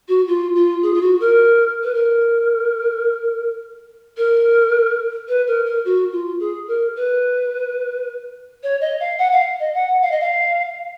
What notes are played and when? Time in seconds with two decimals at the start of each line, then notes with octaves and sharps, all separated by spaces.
0.08 F#4
0.27 F4
0.55 F4
0.82 G#4
0.94 F4
1.01 F#4
1.20 A#4
1.83 B4
1.94 A#4
4.17 A#4
5.28 B4
5.47 A#4
5.65 A#4
5.85 F#4
6.12 F4
6.40 G#4
6.67 A#4
6.96 B4
8.63 C#5
8.81 D#5
9.00 F5
9.18 F#5
9.32 F5
9.60 D#5
9.74 F#5
10.02 F5
10.11 D#5
10.20 F5